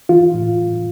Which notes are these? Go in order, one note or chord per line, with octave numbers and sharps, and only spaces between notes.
E3 F4
A2